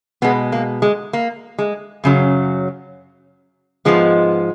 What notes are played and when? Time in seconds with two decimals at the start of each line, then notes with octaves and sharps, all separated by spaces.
0.22 B2 G#3 B3
0.52 A#3
0.82 G#3
1.13 A#3
1.59 G#3
2.04 F#2 C#3 F#3
3.85 G#2 F3 G#3 B3